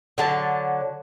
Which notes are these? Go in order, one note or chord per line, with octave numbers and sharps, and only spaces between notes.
D3 F#3 A5